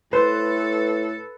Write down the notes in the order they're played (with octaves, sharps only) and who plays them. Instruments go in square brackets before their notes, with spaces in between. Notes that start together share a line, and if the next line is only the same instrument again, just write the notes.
[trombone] A2 [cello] A4 [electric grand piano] B4 [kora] C5